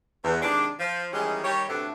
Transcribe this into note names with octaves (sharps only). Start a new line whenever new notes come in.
E2
C3 D#3 G#3 D4
F3
D#3 E3 G3 G#3 C#4 G#4
D#3 G3 G4 C#5
D2 A2 C3 A3 B3 D4